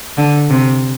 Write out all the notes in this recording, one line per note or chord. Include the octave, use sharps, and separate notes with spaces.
D3
C3